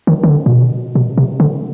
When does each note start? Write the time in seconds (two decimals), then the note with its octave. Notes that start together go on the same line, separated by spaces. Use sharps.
0.07 D#3
0.23 D#3
0.30 D3
0.46 A#2
0.51 B2
0.95 B2
1.17 C3
1.40 D3